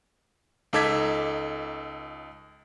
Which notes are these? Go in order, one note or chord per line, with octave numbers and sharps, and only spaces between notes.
C#2 D#4 A4 D6 G#6 B6